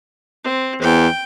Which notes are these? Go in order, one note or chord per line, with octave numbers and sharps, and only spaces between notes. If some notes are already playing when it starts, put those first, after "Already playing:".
C4
E2 G5